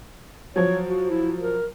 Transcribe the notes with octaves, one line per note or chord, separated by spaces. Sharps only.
F3 F#3 C#5
F#4
E4
A#4